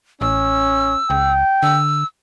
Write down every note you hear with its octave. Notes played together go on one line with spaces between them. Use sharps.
A1 C#4 E6
C#2 G5
D3 E6